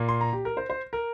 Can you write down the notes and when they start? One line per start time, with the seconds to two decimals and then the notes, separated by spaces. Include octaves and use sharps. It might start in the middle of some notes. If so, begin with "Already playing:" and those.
Already playing: A#2 A#3
0.09 C6
0.21 A#5
0.33 G4
0.45 A#4
0.57 C5
0.70 C5
0.93 A#4